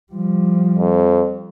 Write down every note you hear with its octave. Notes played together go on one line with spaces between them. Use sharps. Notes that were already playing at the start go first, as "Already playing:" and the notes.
F3 G3
F2